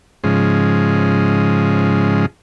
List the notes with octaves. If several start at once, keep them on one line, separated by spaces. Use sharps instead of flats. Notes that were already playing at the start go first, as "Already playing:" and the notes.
G#2 C#3 F3 G#3